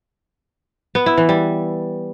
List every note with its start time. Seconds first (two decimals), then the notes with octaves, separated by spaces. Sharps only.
0.95 B3
1.06 E4
1.18 E3
1.29 G3